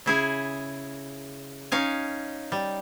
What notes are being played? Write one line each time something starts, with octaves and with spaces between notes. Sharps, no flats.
C#3 E4 G#4
C#4 D#4 F5 G#5
G3